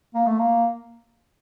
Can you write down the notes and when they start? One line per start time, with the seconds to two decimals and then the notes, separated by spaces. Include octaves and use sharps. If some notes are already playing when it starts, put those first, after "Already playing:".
0.14 A#3
0.27 A3
0.39 A#3